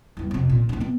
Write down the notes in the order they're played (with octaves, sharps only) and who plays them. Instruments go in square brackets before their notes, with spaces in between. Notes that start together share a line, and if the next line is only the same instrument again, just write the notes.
[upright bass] G1 E2
F2 C3
A#2 D3
D1 D4
B3 C4